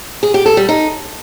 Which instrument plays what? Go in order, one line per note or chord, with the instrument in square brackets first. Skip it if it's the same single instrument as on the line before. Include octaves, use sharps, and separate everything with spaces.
[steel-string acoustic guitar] G#4
G4
A4
G3
D#4